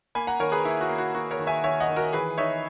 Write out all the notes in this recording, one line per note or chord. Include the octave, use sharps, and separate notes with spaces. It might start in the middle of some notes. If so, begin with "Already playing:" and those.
A#3 G#5 B5
F#5 A#5
D#3 A#4 C#5
G#4 B4
A#3 E4
F#4
A#3
F#4
A#3 F#4
A#4 C#5
D#3
E5 G#5
D#3 C#5 E5
D#5 F#5
D#3
F#4 A#4
E3 G#4 B4
D#4 C#5 E5